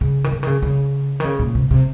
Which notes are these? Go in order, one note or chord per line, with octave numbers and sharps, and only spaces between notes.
C#3
D#3
C#3
D#3
C#3
C#3
D#3
C#3
A#2
C3
C3